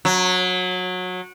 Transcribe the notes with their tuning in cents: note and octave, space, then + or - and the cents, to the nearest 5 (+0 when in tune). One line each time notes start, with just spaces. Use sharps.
F#3 -20